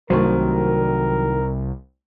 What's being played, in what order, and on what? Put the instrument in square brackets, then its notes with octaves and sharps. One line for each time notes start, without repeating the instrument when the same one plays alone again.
[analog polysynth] C2 [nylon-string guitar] D#3 A3 [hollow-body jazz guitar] F#3 C5 [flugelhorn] A#4